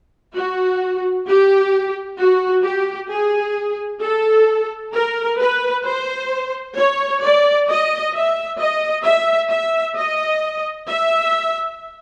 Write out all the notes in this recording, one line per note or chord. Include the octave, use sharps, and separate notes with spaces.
F#4
G4
F#4
G4
G#4
A4
A#4
B4
C5
C#5
D5
D#5
E5
D#5
E5
E5
D#5
E5